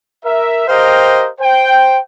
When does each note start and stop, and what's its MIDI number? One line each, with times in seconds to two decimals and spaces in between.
0.25 0.64 70
0.25 0.64 76
0.67 1.28 67
0.67 1.28 70
0.67 1.28 72
0.67 1.28 75
0.67 1.28 77
0.67 1.28 79
1.40 1.98 72
1.40 1.98 79